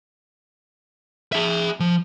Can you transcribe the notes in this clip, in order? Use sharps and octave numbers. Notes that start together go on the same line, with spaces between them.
G#4 E5
F3